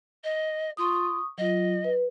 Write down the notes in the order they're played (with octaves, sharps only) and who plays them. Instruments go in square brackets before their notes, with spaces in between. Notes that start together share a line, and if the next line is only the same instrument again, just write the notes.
[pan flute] D#5
[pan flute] F4 [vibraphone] C#6 D#6
[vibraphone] F#3 F4 [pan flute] D#5
[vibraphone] B4